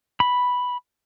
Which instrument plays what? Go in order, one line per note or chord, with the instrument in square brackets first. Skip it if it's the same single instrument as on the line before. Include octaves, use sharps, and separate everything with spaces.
[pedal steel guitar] B5